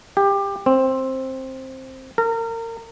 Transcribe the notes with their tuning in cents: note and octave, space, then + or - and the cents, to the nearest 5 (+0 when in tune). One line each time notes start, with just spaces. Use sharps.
G4 +20
C4 +10
A#4 -30